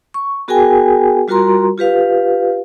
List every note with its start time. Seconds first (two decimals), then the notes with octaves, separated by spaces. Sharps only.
0.14 C#6
0.48 B3 F#4 G#4 A#4 G5 G#5
1.28 G3 F4 F#4 A#4 A#5 C6
1.78 F4 G4 B4 F5